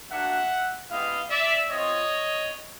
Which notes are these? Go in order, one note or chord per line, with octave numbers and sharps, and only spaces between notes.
A#3 D4 F#4 E5 F#5
G#3 B3 E4 G4 D#5 F5
D5 E5
C4 F4 C#5 D#5